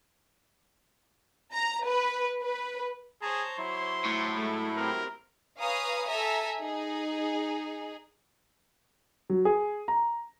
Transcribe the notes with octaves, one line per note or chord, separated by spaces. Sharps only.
A#5
B4
B4
G#4 C5 C#5 A5 A#5
F#3 E4 C6
A2
G#3 A3
C4 G4 A#4
B4 C#5 F5 G#5 A#5 D#6
A4 E5 G#5 A#5
D#4 G#4
F#3
G#4
A#5